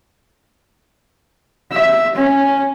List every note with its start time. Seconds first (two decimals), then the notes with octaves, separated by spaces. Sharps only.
1.72 E5
2.15 C#4